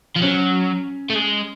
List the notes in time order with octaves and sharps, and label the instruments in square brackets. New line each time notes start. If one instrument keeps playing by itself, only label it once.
[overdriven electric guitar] F3
[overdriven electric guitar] F#3 [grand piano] C#4
[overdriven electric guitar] A3
G#3